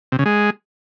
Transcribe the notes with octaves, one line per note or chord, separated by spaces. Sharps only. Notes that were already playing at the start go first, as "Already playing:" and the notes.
C3
C#3
G#3